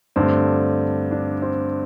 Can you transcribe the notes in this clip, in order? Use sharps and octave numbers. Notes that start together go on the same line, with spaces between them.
G2 D3 A3 C4
D4
C4